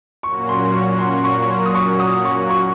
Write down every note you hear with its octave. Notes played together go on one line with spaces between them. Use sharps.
A#2 F#3 A#3 C#4 F#4 C#6
C6
C#6
C6
C#6
C6
D#6
C#6
D#6
C#6
C#6